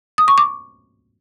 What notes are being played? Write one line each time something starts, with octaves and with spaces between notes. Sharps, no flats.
D#6
C#6
D6